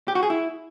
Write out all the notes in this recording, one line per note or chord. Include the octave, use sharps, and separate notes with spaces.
G4
F#4
G#4
E4